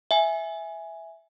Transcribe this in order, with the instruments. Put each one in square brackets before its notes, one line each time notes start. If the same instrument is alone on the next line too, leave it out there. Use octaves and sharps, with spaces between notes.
[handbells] E5 G#5